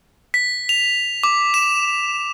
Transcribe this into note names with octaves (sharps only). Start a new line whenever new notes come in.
B6
F7
D6
E7